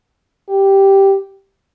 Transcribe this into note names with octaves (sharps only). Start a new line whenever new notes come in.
G4